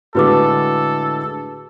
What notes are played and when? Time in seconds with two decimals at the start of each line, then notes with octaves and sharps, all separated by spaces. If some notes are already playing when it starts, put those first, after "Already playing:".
0.15 A2 D3 G#3 F#4 A4 B4 D6